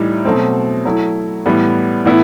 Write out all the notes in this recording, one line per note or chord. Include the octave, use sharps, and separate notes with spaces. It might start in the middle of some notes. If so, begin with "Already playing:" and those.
Already playing: A2 E3 G3 D#4
B2 F#3 A3 C4
F#3 A3 E4
A2 E3 G3 B3
A2 E3 B3 E4